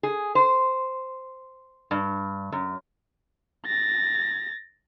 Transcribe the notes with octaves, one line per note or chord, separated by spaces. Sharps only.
G#4
C5
G2
F#2
A6 A#6